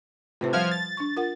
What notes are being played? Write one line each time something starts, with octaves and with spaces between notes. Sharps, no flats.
A2 C3 F4 B4 C5
F3 G3 E5 F5 F6 G#6
A6
D4 C#6
F4 A#4 F#5